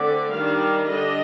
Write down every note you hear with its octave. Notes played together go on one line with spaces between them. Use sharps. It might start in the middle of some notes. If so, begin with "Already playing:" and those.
Already playing: D3 A3 C4 D5
D#3 G3 D4 F5
D3 G3 D4 D#5